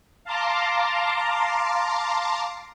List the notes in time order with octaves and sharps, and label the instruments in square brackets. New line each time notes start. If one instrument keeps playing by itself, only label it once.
[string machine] F5 A5 A#5 C6 D6